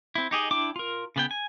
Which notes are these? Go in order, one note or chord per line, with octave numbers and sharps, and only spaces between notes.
C4 E4
D#4 G4 G#4 D#5
D4 E4 G5 D6
F4 A#4
C#3 B3 G5
G#5